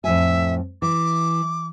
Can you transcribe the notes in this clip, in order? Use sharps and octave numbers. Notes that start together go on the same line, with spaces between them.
F2 A2 E5 G#5
E3 D6